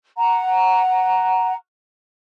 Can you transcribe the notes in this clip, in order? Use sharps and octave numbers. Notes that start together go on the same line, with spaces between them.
F#5 A#5